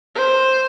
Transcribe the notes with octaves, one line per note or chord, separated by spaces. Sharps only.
C5